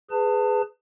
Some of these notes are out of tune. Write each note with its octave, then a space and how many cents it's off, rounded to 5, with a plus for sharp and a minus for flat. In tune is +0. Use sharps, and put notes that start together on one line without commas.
G#4 +0 B4 +15 A5 +25